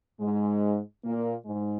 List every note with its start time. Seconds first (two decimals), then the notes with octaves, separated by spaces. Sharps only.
0.20 G#2 G#3
1.04 A#2 A#3
1.46 G#2 G#3